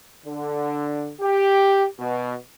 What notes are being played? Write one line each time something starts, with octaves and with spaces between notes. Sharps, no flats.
D3
G4
B2